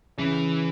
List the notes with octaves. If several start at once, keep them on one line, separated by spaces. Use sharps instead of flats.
C#3 E3